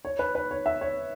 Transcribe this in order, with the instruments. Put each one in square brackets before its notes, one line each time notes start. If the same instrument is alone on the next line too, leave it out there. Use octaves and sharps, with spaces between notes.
[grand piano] C#5
B4
B4
C#5
E5
C#5